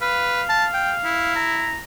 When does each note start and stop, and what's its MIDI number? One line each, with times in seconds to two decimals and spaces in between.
0.01 0.42 71
0.01 1.35 77
0.49 0.66 81
0.74 0.93 79
1.05 1.80 64
1.36 1.81 82